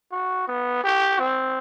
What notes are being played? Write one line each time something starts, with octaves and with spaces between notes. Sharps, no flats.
F#4
B3
G4
C4